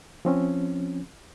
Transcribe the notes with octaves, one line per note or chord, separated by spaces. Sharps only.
F3 C4 C#4